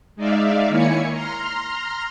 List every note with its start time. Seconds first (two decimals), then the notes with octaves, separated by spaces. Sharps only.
0.16 G#3 D#4 D5 E5 F5
0.69 D#3 A#3 E4 C#5 G#5 C#7
1.12 A#5 C6 F6